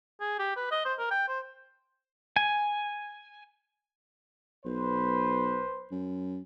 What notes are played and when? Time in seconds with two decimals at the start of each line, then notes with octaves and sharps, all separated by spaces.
0.21 G#4
0.39 G4
0.57 B4
0.71 D#5
0.85 C5
0.99 A#4
1.11 G5
1.28 C5
2.36 G#5
4.65 B1 B4 C5
5.91 F#2